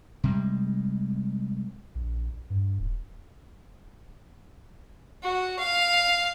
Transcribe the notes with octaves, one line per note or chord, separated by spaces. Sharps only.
C3 G3 G#3
A#1
G2
D1
F#4
F5